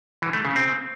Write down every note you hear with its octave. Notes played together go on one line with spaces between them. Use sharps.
E3
A3
C#3
C4